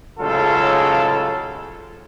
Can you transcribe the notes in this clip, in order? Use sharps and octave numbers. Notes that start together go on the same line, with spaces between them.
A1 G#2 C#3 F#3 F4 A4